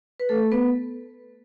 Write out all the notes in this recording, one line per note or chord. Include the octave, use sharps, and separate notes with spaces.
B4
A3 A4
B3 B4